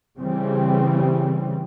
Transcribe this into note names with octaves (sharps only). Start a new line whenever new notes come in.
C#3 E3 G3 C4